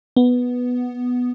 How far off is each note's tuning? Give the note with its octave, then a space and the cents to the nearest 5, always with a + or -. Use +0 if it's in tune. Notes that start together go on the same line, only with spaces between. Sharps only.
B3 +0